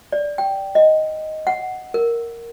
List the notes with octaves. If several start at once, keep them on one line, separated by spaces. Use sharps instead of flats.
D5
G5
D#5
F#5
A#4